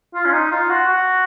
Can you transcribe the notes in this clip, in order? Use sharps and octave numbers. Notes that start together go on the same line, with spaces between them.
F4
C#4
D#4
F4
F#4
F#4